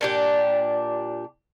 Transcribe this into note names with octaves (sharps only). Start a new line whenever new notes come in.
A#2 D4 G4